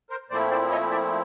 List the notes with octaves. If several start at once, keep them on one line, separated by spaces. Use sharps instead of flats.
A#4 C5
A#2 F3 A3 C4 E4 C5 D5
C5 D5
C#5 D#5
D5 E5